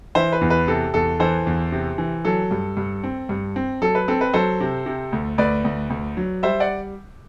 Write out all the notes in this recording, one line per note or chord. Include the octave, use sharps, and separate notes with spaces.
E3 C5 E5
B4
E2
B4
C3 A4
E2 A4
E3 A4 C5
E2
C3
E3
F#3 A4
G2
G2
C4
G2
C4
F#3 A4
B4
C4 A4
B4
F#3 A4 C5
C3
C3
D2
D2 B4 D5
D2
D2
F#3
G3 C5 E5
D5 F#5